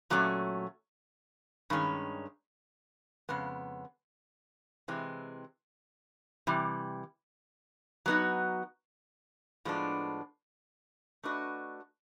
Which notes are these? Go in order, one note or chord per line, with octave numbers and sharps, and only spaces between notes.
A#2 F#3 A3 C#4
G2 D#3 G#3 C#4
F2 C#3 G#3 B3
C3 E3 G#3 C4
C3 E3 G3
F#3 B3 D#4 F#4
A2 F3 G#3 B3 D4
A3 D4 F#4 B4 D#5